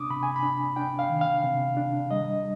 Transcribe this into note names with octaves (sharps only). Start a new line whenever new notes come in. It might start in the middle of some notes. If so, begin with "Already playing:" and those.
Already playing: C3 D4 D6 D#6
C3 B5
G#5
B5
D4
D4 G5
F5
D#3
F5
C3
D4
G3 D#5